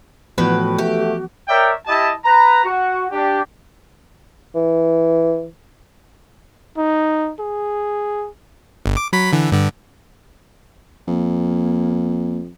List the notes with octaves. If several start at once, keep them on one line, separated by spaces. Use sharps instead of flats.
A2 E3 F3 B3 F#4 B4 G5
A3 G4
A#4 C#5 D5 E5 G5
E4 G4 D#5 A5
B4 A#5
F#4
D4 G4
E3
D#4
G#4
G1
D6
F#3 B5 B6
D3 E3
G2 D3
F2 A#3